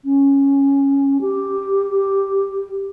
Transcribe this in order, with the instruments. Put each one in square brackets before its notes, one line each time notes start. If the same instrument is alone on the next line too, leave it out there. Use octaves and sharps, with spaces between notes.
[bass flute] C#4
G4